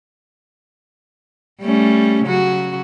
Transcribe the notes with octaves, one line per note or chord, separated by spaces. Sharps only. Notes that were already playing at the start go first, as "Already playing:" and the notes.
G3 A3 C#4
C#3 F#3 F#4